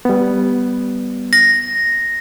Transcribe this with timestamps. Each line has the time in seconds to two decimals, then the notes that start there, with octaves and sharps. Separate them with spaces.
0.05 G3 B3
1.33 A#6